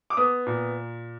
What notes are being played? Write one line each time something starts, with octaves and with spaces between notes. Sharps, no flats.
D6
B3 D#6
A#2